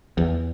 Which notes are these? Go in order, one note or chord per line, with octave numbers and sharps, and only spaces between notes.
E2